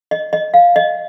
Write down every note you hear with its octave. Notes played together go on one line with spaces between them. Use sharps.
D#5
D#5
F5
D#5